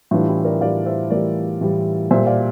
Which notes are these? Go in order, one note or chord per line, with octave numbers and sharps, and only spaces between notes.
A2 E3 G3 D4 F4
E4 G4
A#4 D5
A2 E3 G3 D5 F5
C5 E5
A2 E3 G3 A#4 D5
A2 E3 G3
A#2 G3 C5 E5
D5 F5